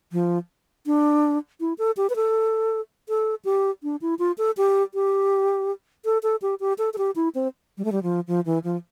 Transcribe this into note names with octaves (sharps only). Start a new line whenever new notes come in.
F3
D4
E4
A4
G4
B4
A4
A4
G4
D4
E4
F4
A4
G4
G4
A4
A4
G4
G4
A4
A4
G4
E4
C4
G3
A3
G3
F3
F3
E3
F3